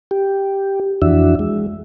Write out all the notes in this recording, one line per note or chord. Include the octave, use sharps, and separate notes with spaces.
G4
F2 E3 D4 F#4 E5
G#3